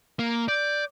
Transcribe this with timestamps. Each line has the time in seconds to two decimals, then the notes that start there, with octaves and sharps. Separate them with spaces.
0.19 A#3
0.48 D5 G6